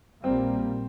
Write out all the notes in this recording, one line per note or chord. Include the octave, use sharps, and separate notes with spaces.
A#1 A#2 G3 A#3 C4